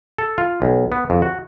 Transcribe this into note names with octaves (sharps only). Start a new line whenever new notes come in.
A4
F4
B1
B3
F2
F#4